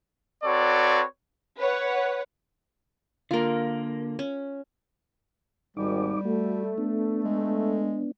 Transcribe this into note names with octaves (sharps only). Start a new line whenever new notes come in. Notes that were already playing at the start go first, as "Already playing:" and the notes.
C4 F#4 A4 B4 C#5 D5
B4 C#5 F#5
D3 A#3 F4 A#4
C#4
G#1 D#2 G3 D#4 D6
A3 F#4
B3 D4
G#3